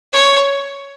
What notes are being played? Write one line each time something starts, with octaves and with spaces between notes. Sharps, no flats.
C#5